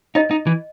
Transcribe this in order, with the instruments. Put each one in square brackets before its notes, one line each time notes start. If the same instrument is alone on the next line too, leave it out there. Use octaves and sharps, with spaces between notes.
[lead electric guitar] D#4 [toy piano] D#5
[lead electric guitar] D#4
E3